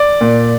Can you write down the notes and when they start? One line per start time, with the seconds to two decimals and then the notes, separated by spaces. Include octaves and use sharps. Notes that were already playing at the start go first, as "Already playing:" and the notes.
Already playing: D5
0.21 A#2